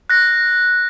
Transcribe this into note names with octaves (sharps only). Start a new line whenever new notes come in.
F#6 A#6